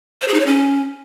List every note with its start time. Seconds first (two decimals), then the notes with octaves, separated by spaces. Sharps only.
0.22 C5
0.28 G#4
0.34 D#4
0.40 C#5
0.46 C#4